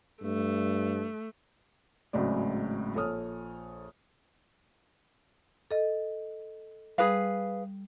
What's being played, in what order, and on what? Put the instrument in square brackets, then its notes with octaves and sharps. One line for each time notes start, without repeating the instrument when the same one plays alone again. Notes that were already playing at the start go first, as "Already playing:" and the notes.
[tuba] G2 [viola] A3
[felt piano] G#1 A2 C#3 F#3 G#3 D5
A#1 A4 C#5 D#6 F6
[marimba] A4 D#5
[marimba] G3 D#6 [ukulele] G#4 B4 F5